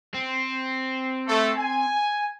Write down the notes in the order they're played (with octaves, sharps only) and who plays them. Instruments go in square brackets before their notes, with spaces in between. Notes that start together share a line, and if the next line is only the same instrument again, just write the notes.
[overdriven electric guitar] C4
[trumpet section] A3 A4
G#5